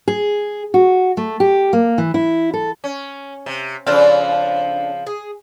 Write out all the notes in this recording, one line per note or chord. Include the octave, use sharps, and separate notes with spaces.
G#4
F#4
A3
G4
A#3
E3
E4
A4
C#4
C3
C#3 F3 C4 D4 A4 F5
G#4